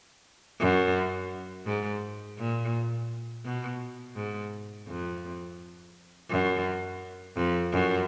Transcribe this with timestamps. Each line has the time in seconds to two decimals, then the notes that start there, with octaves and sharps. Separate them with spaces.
0.60 F#2
1.66 G#2
2.38 A#2
3.45 B2
4.16 G#2
4.88 F2
6.30 F#2
7.37 F2
7.73 F#2